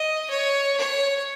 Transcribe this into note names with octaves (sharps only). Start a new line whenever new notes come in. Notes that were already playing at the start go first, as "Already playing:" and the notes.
Already playing: D#5
C#5
C#5